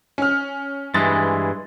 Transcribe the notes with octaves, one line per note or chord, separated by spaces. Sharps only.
C#4 F6
G2 E3 G#3 A6